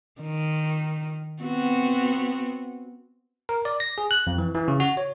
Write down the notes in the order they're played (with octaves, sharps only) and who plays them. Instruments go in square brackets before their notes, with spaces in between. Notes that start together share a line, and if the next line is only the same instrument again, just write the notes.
[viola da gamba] D#3
B3 C4 F#4
[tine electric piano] A#4
D5
A#6
G#4
F#6
F2
E3
E3
C#3
F#4
C#5